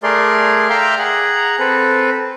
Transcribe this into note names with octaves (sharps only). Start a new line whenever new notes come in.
A3 G#4 A#4 D5 C6
E5 F5 G5 A#5 C6 D6
G#4 F#5 A#5
C4 A4 B4